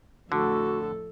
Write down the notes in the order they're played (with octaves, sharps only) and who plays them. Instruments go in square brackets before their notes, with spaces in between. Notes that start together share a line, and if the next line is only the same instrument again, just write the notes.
[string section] F2 A2 [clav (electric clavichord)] D3 [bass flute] F#4 [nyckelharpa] A4